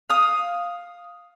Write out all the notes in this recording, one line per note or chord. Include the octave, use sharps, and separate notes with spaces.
F5 D#6